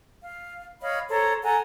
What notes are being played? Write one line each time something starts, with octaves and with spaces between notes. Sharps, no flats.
F5
C#5 D#5 F5 B5
A4 C5 C#5 A#5
A4 F#5 G#5 A#5